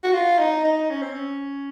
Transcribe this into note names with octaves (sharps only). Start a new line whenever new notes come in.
F#4
F4
D#4
D#4
C#4
C4
C#4